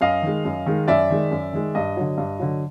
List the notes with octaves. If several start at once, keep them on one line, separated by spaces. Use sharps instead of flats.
F#2 D#5 F5
D#3 G#3
F#2
D#3 G#3
F#2 D5 E5
D#3 G#3
F#2
D#3 G#3
G2 D#5
D3 F#3
G2
D3 F#3